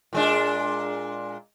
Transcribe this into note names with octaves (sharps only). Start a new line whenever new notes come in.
A#2 G#3 D4